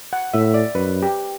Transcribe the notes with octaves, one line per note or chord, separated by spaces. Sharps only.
F#5
A2 E5
D5
F#2 B4
G4